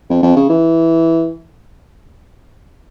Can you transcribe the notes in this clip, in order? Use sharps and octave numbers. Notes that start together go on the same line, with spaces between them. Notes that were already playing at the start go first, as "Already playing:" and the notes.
F2
F2
C#3
E3